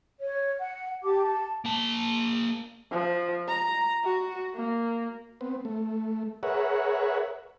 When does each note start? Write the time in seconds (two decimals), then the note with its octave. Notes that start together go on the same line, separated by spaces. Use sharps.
0.20 C#5
0.59 F#5
1.04 G4 A5 D6
1.22 A5
1.65 A#3 A5
2.91 F3
3.48 A#5
4.04 F#4
4.54 A#3
5.41 B3 C4
5.65 A3
6.43 G#4 A#4 B4 C#5 E5 F#5